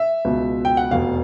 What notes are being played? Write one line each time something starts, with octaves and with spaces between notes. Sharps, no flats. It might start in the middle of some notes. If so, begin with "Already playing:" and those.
Already playing: E5
C#2 B2
G5
F#5
F1 E2 B2 F5